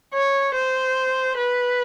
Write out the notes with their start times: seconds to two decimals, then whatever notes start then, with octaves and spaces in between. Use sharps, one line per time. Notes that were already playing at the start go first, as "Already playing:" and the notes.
0.14 C#5
0.55 C5
1.37 B4